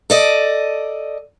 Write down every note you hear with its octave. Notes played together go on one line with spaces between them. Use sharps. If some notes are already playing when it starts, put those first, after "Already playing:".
A4 D5 D#5